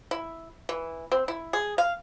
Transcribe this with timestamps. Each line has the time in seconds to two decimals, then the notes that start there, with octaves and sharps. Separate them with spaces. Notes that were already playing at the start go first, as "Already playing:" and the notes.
0.11 E4
0.69 E3
1.12 C4
1.28 E4
1.53 G#4
1.78 F5